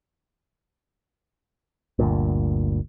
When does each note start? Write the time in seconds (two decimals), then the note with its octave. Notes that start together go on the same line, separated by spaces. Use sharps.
1.99 G1 D2 G2 A#2